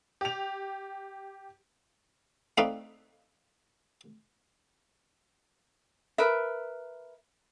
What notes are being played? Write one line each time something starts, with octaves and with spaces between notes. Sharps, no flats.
G4 F7
A3 C4 D#4 B4 D5 F5
A#4 B4 E5